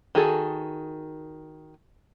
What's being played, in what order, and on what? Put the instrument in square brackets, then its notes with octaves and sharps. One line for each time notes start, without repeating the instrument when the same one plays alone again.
[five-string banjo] D#3 F#4 G#4 A4